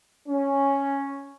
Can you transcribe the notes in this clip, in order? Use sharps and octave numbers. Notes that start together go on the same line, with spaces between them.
C#4